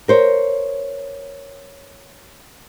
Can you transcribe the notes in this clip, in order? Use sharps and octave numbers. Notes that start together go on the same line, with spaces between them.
A#4 C5 C#5